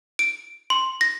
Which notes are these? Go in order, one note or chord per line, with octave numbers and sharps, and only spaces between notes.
D7
C6
A#6